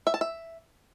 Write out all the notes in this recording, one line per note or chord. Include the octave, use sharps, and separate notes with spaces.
E5
A5
E5